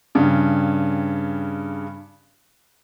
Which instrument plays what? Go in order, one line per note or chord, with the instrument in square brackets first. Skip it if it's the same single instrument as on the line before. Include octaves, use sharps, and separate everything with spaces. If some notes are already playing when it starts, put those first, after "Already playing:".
[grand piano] G2 C#3